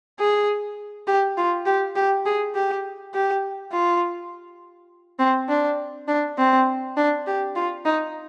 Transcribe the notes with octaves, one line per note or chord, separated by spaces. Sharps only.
G#4
G4
F4
G4
G4
G#4
G4
G4
F4
C4
D4
D4
C4
D4
G4
F4
D#4